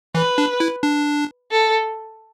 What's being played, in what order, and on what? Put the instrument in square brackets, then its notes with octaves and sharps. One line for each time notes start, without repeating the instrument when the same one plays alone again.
[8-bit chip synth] E3 [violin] B4
[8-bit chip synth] D4
E4
D4
[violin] A4